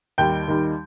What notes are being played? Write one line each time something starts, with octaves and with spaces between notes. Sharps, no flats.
D#2 D#3 G3 G5 G6
D#2 D#3 G3